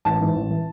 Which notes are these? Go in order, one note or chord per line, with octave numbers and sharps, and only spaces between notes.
A1 A5
G#2 E3
A1
E3